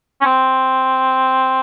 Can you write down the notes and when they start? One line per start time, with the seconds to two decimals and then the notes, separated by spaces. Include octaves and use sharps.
0.21 C#4
0.25 C4